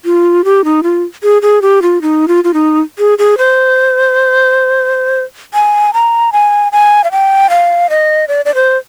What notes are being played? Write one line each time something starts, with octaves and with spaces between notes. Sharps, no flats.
F4
G4
D#4
F4
G#4
G#4
G4
F4
D#4
F4
F4
D#4
G#4
G#4
C5
G#5
A#5
G#5
G#5
F5
G5
F5
D#5
D5
D5
C5